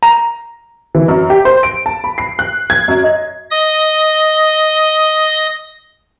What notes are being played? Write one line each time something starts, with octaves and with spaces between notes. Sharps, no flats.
A#5
E3
F#2
G4
C5
D7
A5
B5
C7
F#6
G#6
F#2
D#5
D#5 D#6